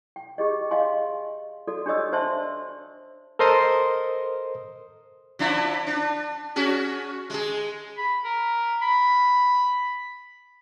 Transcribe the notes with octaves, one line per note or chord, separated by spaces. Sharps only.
G5
G4 G#4 D#5
D#5 F5 G#5 C6
F#4 A4 D5
D4 G4 C#5 D#5 D#6 E6
D4 C5 D5 E5 A5 C6
A4 A#4 C5 D#5 C6 D#6
F3 D4 E4
D4
C#4 F#4 G#4
G#3 G#4
B5
A#4
B5